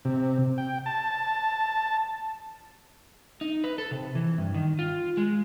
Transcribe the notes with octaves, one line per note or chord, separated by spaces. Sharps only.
C3
G5
A5
D#4
B4
A4
C3
E3
G2
D#3
F4
G#3